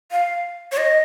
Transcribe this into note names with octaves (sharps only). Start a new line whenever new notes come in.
F5
C#5
D#5